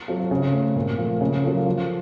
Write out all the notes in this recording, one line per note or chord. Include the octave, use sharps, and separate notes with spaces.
F#3 C4 F4 A4
C#3
A3 C4
A#2
F3 A3
C#3
F#3 A#3 F4 A4
F3